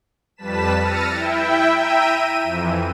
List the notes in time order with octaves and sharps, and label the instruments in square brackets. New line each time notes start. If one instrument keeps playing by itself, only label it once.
[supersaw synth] F2 G3 B4 A5 B6 E7
E6 F6 A6 A#6 C#7 D#7
E4 E5 G5
E5 G5 A#5 E6 D#7
D#7
F2 E3